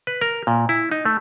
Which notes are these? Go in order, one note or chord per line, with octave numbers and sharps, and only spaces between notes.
B4
A#4
A#2
E4
D#4
A3